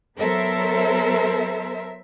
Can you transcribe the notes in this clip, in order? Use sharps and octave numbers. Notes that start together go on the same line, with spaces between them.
F#3 B3 A4 A#4 C5 E5